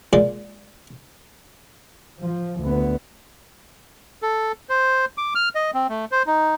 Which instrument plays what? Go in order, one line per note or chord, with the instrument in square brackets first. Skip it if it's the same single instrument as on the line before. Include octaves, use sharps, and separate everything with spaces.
[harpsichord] A#2 G#3 D5
[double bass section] F3
D2 B3
[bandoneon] A4
C5
D6
F6
D#5
C4
A3
C5
D#4